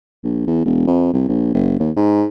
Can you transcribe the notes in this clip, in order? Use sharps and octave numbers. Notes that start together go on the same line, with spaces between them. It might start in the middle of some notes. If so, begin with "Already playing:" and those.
A#1
E2
E1
F2
C2
A#1
F#1
D#2
G#2